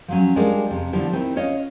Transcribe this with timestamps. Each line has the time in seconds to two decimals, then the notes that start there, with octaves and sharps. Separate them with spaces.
0.08 F3 F#3 C#4
0.36 G3 G#3 D4 F4 A#4 D#5
0.71 F2 C3
0.93 D3 F3 G3 B3 E4
1.13 D#3 C4 D#4 E4
1.36 C#4 F4 C#5 D#5